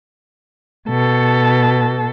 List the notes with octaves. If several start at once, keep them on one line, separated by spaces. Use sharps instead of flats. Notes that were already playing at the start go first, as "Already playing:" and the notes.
B2 A4